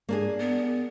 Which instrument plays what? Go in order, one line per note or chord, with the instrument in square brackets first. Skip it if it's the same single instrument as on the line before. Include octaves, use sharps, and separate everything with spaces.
[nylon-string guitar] A#3 D4 G#4
[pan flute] B3